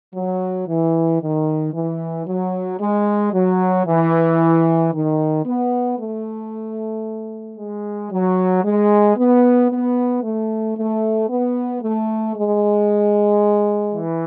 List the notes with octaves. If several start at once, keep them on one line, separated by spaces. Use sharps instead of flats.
F#3
E3
D#3
E3
F#3
G#3
F#3
E3
D#3
B3
A3
G#3
F#3
G#3
B3
B3
A3
A3
B3
A3
G#3
E3